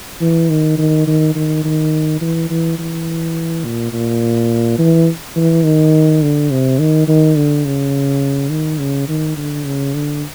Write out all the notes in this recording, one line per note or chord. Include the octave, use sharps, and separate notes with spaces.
E3
D#3
D#3
D#3
D#3
D#3
E3
E3
E3
A#2
A#2
E3
E3
D#3
D3
C3
D#3
D#3
D3
C#3
D#3
C#3
D#3
D3
C#3
D3